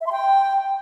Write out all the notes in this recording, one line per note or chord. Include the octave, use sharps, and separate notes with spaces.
E5
C6
G5